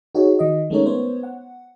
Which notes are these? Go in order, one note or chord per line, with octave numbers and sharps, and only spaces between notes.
D#4 F#4 G#4 C#5
D#3 D#5
G#3 A3 C#4 D#4 A#4 C#5
B3 C5 C#5
F#5